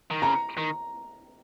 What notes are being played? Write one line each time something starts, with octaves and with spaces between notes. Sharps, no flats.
D#3
C#3 A#5
D#3